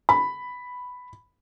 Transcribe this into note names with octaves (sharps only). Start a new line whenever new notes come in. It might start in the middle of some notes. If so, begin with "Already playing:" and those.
B5